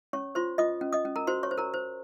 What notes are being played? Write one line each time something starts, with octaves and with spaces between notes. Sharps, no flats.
C#4 C#5 C#6
F4 C5 C6
F4 D#5 D#6
C#4
D#5 D#6
C#4
A#4 A#5
F#4 C5 C6
C#5 C#6
C5
A#4 A#5
C5